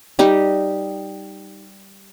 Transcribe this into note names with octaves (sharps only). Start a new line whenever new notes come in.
G3 D#4 G4